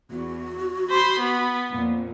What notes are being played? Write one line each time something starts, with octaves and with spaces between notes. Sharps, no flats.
E2 F#4
C5 B5 C6
B3
F2 A#2